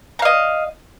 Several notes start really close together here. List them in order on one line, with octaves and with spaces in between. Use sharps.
A#5 F5 D#5